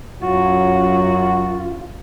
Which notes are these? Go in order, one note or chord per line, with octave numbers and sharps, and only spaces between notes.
F#2 F#3 F4 F#4